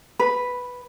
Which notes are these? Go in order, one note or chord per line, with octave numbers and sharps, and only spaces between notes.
B4